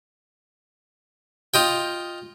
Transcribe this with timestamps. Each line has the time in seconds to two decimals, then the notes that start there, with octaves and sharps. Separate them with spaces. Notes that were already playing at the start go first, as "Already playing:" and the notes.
1.54 F4 D#5 G5